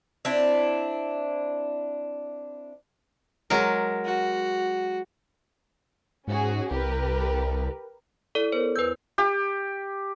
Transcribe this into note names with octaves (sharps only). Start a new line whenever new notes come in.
C4 D4 E4
F#3 G#3 A#4
F#4
G#2 C#4 F#4 G#4
C2 G4 A#4 B4
E4 A4 D5
B3 A#4 C5 C#5
E2 B4 E6 G6
G4